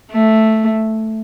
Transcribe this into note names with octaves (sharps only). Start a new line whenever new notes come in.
A3